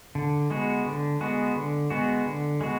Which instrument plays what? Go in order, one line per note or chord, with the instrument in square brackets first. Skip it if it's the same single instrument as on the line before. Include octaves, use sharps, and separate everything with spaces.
[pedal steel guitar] D3
G#3 B3 F#4
D3
G#3 B3 F#4
D3
G#3 B3 F#4
D3
G#3 B3 F#4